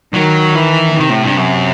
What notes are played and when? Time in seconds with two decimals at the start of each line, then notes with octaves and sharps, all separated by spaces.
0.14 D#3 F#3
0.55 E3
0.96 C3 D#3
1.10 A2
1.24 G2
1.37 F#2